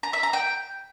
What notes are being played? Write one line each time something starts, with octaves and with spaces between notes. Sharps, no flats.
A#5
E5
A#5
G5